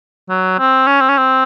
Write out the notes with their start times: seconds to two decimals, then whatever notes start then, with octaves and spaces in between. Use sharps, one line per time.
0.29 F#3
0.59 C4
0.87 C#4
1.01 C4
1.09 C#4
1.17 C4